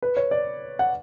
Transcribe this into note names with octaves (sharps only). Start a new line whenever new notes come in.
B4
C#5
D5
F#5